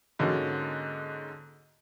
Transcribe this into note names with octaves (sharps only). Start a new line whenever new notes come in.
G#2 D3 A#3 C#4 D4 F#4